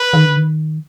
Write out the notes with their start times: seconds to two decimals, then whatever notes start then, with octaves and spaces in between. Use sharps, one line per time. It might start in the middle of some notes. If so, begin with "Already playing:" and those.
Already playing: B4
0.13 D#3
0.24 D3
0.36 D#3